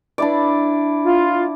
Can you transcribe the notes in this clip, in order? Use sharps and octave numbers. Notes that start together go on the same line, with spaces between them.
D4 E4 D5
F4